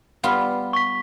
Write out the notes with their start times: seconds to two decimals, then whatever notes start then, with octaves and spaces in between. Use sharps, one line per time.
0.23 G3 B3 F4
0.73 C#6 B6